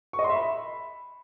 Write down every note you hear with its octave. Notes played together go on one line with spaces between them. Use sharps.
C#6
D#5
C6
E5
B5